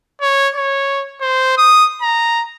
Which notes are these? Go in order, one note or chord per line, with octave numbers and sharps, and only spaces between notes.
C#5
C#5
C5
D#6
A#5